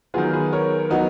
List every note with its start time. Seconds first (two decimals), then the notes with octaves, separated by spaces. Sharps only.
0.14 D#3 F#3 B3 F4 G#4
0.33 G#4 B4
0.53 A#4 C#5
0.90 F#3 B3 D#4